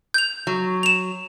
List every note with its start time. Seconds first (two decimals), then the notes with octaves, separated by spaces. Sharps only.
0.14 G6 F7
0.47 F#3
0.83 E7 F7